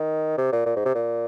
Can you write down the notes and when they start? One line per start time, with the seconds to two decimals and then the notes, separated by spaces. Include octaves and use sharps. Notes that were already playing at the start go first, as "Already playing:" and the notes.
Already playing: D#3
0.38 C3
0.52 A#2
0.66 A#2
0.76 G#2
0.85 C3
0.95 A#2